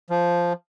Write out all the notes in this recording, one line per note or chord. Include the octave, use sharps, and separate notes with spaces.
F3